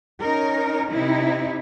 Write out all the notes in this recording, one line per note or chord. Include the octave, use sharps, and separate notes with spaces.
C#4 D#4 A#4
C3 D#4 E4